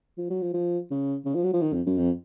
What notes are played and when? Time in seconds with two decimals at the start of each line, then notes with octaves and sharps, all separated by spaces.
0.18 F3
0.30 F#3
0.42 F3
0.53 F3
0.90 C#3
1.25 C#3
1.35 F3
1.44 F#3
1.53 F3
1.61 D#3
1.73 F2
1.86 F#2
1.98 F2